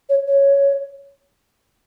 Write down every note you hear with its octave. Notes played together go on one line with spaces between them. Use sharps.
C#5
C#5